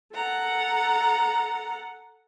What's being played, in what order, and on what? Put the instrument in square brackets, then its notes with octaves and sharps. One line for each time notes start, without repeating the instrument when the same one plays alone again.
[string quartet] A4 F#5 A#5